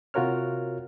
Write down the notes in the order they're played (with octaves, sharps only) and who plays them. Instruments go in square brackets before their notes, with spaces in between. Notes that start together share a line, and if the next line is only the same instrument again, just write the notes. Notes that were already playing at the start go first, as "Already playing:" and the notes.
[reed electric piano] C3 F4 F#4 A#4 C#5 F6